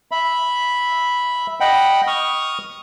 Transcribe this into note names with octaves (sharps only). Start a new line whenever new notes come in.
E5 B5
D#5 F#5 G5 B5
C#6 D#6 F6